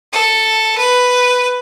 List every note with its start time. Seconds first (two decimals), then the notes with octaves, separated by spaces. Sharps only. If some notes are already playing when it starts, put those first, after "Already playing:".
0.13 A4
0.78 B4